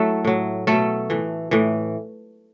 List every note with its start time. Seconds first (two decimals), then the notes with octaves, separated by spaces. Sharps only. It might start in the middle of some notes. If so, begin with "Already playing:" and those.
Already playing: F#3 A3 E4 F#4 A4
0.25 A2 F#3
0.67 B2 F#3 A3 A4
1.10 A2 E3
1.51 A2 E3